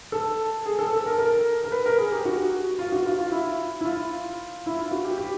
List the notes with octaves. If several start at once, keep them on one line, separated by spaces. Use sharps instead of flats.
A4
G#4
A4
A4
A#4
A#4
A#4
B4
A#4
G#4
G4
F#4
F4
F#4
F4
F4
E4
E4
F4
E4
F4
F#4
G4
G4